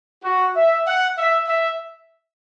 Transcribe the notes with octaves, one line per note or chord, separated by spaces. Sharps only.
F#4
E5
F#5
E5
E5